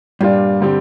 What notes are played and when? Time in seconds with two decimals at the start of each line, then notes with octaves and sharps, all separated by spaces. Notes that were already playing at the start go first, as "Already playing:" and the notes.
0.21 G2 A#2 G3 D4 F4
0.60 D3 G3 C4 G4